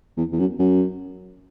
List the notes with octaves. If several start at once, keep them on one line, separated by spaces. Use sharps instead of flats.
E2
E2
F#2
F#2